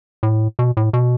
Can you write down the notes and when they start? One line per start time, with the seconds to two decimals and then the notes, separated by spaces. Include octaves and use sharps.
0.23 A2
0.59 B2
0.77 A2
0.93 B2